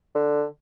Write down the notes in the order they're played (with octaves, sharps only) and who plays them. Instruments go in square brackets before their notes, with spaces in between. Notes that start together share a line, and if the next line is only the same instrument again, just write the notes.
[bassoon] D3